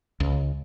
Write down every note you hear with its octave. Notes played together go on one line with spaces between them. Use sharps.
C#2